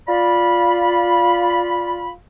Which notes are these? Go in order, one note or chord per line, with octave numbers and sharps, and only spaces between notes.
F4 D5 B5